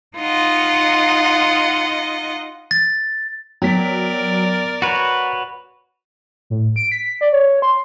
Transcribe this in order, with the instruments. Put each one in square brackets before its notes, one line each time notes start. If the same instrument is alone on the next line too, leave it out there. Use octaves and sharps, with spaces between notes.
[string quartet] D#4 F4 D#5 F#5
[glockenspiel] A6
[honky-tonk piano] F#3 B6 [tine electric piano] B3 G5 [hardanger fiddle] A#4 D5
[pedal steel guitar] F#4 B4 C#5 [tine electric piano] F#5 A#5 [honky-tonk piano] F7
[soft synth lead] A2
D7
B6
D5
C#5
C6